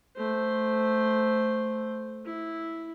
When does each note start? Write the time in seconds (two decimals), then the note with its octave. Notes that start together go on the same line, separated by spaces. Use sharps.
0.16 A3 C5
2.26 E4